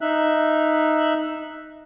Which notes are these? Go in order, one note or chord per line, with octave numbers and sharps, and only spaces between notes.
D#4 E5 F#6